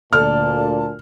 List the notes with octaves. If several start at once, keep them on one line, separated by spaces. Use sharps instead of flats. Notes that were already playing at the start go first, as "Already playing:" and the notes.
D2 A#2 A4 D5 A5 F6